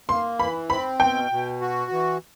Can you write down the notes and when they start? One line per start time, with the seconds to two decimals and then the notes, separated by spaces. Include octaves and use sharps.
0.09 A#3 C6
0.39 E3 B5
0.70 C4 B5
1.00 B2 G5
1.31 B2
1.61 F#4
1.91 E3